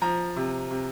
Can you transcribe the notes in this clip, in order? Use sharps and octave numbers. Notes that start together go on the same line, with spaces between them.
F3 A#5
C3
C3